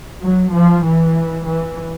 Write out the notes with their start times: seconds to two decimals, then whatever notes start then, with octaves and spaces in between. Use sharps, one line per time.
0.21 F#3
0.52 F3
0.84 E3
1.46 E3